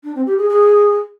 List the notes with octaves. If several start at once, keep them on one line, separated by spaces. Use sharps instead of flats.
D4
C4
G4
G#4
G#4